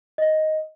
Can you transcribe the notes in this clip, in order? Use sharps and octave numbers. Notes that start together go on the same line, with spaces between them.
D#5